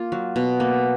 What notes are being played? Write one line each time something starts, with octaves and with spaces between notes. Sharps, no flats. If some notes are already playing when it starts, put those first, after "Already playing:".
Already playing: A#3 F4
F#3
B2
A#3